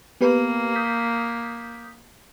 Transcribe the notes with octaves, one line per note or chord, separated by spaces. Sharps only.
A#3 B3 G4 B4
D#6 G6 B6